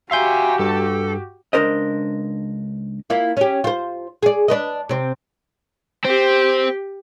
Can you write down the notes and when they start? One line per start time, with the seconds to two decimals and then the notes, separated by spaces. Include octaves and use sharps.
0.11 F#4 G4 E5 F5 G#5 C6 G6
0.59 G2 A4
1.53 C#2 C3 D4 A#4 C5 D#5
3.10 A#3 E4 F4
3.37 C#4 G4
3.64 F4 C5
4.23 G#4 D5
4.48 D4 B4 D#5
4.89 C3 C4
6.05 C4 G4